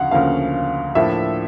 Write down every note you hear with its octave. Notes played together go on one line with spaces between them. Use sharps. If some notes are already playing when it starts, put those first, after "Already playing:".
Already playing: D2 C#3 F3 C#4 F5 F#5
D2 C#3 F3 A#3 C#4 F5
A2 F3 A#3 D4 E5